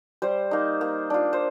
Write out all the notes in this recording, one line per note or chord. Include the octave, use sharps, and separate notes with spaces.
G3 C5
A#3 D#4
A#3
D4 F4
C5